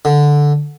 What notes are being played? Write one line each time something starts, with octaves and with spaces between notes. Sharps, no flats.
D3